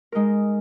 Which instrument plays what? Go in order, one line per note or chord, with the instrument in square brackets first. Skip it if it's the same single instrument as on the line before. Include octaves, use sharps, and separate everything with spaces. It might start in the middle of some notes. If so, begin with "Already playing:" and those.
[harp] G#3 D#4 A#4